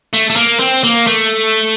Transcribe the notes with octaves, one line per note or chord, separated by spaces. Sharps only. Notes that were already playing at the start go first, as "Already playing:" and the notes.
A3
A3
A#3
C4
A#3
A3